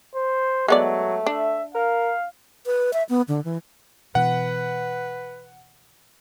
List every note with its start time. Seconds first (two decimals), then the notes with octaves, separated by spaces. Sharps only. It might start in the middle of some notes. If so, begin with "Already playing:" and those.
0.15 C5
0.68 F#3 G#3 A3 B3 D5
1.26 D4 E5
1.75 A#4 F5
2.66 B4
2.93 E5
3.09 B3
3.28 D3
3.44 E3
4.15 B2 E3 B4 F#5